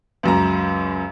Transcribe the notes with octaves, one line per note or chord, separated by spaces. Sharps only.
C#2 F#2 A#5